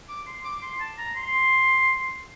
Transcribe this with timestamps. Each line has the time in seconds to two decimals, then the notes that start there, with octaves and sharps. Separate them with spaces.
0.09 D6
0.27 C6
0.44 D6
0.62 C6
0.80 A5
0.98 A#5
1.16 C6